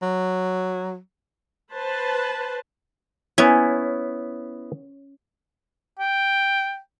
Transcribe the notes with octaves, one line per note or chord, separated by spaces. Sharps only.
F#3
B4 C5 A5
B3 C#4 E4
G5